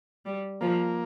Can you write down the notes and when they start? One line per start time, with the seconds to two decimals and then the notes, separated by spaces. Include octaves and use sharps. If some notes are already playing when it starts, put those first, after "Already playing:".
0.26 G3
0.61 F3 A#3